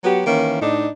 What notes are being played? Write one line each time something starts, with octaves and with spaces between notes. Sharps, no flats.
F#3 B3 F#4 G4
D#3 E3 A#3 C#4
A2 D4 D#4